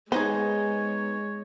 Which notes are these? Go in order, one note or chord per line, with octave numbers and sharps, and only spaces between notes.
G#3 B3 D#4 G#4 C5 C#5